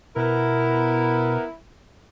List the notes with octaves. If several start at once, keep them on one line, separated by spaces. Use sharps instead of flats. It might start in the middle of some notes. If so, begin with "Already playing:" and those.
B2 B3 E4 A#4